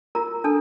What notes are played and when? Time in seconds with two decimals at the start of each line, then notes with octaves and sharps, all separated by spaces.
0.15 F4 A#4 A#5
0.44 D4 A4 A5